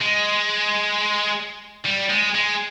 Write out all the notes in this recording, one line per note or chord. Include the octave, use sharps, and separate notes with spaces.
G#3
G3
G#3
G#3